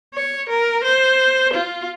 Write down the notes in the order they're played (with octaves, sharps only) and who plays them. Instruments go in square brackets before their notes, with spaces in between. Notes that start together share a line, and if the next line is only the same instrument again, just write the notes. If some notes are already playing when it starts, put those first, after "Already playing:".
[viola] C#5
A#4
C5
F4